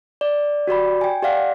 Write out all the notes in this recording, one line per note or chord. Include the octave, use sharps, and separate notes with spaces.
D5
F#4 G4 D5 B5
G5 G#5
G4 D5 F5 F#5